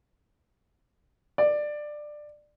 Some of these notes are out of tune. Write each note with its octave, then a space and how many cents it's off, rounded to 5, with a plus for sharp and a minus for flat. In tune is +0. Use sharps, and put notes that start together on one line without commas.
D5 +15